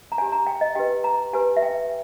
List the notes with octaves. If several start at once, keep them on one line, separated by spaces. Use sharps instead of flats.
A#5
G4 C#5 G#5
A#5
G5
D#5
G4 B4 G5
A#5
G4 B4 G#5
E5
G5